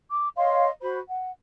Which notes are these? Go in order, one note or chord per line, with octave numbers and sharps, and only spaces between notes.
D6
C#5 D#5 F5 C6
F#4 C5 B5
F#5